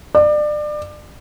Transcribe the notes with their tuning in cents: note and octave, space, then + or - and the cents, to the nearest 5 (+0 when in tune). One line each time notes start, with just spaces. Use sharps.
D5 +30